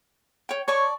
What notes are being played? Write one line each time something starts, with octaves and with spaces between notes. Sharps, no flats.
C#5 G5
C#5 D5 A5 C#6